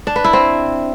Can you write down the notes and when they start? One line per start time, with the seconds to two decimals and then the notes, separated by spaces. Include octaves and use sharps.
0.07 D4
0.16 B4
0.24 E4
0.33 C4